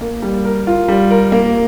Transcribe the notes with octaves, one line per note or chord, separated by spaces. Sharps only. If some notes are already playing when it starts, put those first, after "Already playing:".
A#3
G3
A#4
F4
G3
A#4
A#3